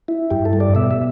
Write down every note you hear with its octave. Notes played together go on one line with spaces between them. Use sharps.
E4
G2 G4
A4
G3
D5
B2 E5
E5